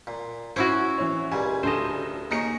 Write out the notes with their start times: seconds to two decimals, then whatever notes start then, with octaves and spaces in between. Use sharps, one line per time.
0.07 A#2
0.56 C#4 E4 F#4 C5 G#5 D6
0.98 E3 C#5
1.32 C#2 A#2 G3 G#5
1.63 D2 A4 C5 D#5 E7
2.31 A#3 D#4 G#4 C#5 A#6 C#7